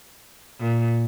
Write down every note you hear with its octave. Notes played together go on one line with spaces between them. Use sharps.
A#2